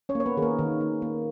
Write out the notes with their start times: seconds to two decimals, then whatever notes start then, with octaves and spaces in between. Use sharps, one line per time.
0.09 C#4 C#5
0.15 A#3
0.20 C#5
0.26 B3 B4
0.37 D#3 G#4
0.42 A#3 A#4
0.59 D#3
0.81 A#3
1.02 A#3